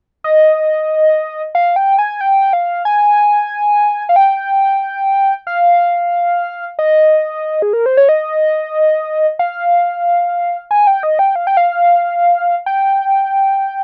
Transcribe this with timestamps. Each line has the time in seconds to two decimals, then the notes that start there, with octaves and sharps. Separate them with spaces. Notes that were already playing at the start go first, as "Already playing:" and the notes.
0.24 D#5
1.55 F5
1.76 G5
1.99 G#5
2.21 G5
2.53 F5
2.85 G#5
4.09 F5
4.16 G5
5.47 F5
6.79 D#5
7.62 G#4
7.73 A#4
7.86 C5
7.97 C#5
8.09 D#5
9.39 F5
10.71 G#5
10.87 G5
11.03 D#5
11.19 G5
11.36 F5
11.47 G5
11.57 F5
12.66 G5